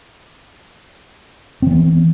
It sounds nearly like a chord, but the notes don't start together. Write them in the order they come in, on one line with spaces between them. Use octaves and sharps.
C4 E3 B3